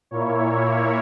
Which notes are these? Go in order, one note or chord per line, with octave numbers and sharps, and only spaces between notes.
A#2 A#3 E4 C#5